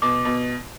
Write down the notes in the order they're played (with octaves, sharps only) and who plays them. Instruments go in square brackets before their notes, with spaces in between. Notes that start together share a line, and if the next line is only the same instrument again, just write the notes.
[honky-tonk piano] B2 [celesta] D6
[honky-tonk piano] B2